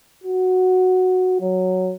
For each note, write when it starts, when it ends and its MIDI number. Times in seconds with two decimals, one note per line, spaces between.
0.24 1.41 66
1.41 1.94 54